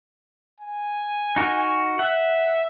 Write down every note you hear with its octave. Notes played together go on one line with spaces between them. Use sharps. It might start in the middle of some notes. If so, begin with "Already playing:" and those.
G#5
D#4 F#4 A#4
E5 F#5